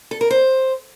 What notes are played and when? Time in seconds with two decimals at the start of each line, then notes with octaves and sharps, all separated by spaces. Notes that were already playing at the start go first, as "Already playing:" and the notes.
0.11 A4
0.21 A#4
0.30 C5